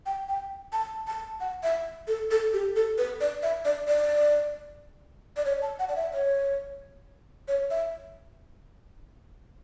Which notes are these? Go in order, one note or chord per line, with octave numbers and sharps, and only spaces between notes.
G5
G5
A5
A5
F#5
E5
A4
A4
G4
A4
B4
D5
E5
D5
D5
D5
C#5
A5
F#5
D5
E5
C#5
C#5
E5